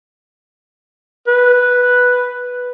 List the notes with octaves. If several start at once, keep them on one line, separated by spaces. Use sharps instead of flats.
B4